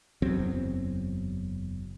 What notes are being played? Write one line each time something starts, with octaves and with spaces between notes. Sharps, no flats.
F#1 E2 F#3 C4